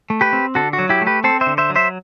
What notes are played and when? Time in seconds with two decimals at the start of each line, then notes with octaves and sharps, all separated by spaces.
0.10 A3
0.21 G4 B4
0.33 C4
0.55 D3 F#4 A4
0.73 F#4
0.78 F#3
0.89 E4 G4
1.02 A3
1.07 G4 B4
1.24 C4 A4 C5
1.41 C5 E5
1.47 D3
1.58 C5 E5
1.70 F#3
1.76 C5 E5